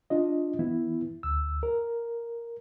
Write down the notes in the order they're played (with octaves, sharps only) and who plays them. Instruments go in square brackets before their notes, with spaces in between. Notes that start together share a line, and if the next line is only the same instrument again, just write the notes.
[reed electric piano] D4 F4 D#5
E3 B3 E4
D2 E6
A#4